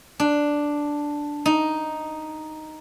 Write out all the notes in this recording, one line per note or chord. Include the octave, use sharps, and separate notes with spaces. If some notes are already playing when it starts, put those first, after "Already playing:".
D4
D#4